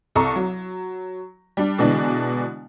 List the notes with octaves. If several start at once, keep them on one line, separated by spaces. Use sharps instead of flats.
C2 A4 A#5 C#6
F#3
G3 D4
B2 D3 E3 G#3 D4